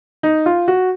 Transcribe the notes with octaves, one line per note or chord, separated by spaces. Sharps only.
D#4
F4
F#4